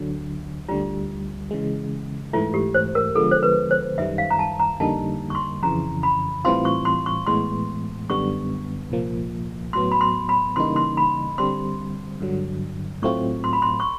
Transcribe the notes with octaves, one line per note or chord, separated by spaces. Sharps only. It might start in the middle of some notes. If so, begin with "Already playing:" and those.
Already playing: D2 D3 F#3
D2 D3 G3 F4
C#3 E3 G#3
G#2 E3 A3 F4
G4
C5
A#4
D3 F3 G#3 B3 A4
C5
B4
C5
F#2 D#3 G3 E5
F5
A#5
A5
A#5
F2 D3 G3 A#3 D#4 A5
C#6
C6
F2 C#3 E3 A#5
B5
A2 E3 G3 C4 F4 C6
C#6
C6
C#6
A2 E3 G#3 B3 C6
F#2 D3 G3 B3 C#6
C2 A#2 F3 A#3
A2 F#3 B3 C6
B5
C6
B5
C#3 E3 G3 A#3 D#4 C6
C6
B5
D3 G3 C4 C6
G2 D3 F#3
A2 F#3 A3 C4 F4 C#6
C6
B5
C6
C#6